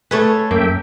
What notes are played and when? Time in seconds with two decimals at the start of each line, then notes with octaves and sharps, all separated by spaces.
0.11 A3 G#4 A4 B4 C#5
0.51 F#2 A#3 E5 G5